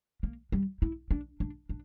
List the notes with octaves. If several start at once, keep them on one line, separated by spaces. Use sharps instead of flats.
A#3
G3
E4
D4
D4
D4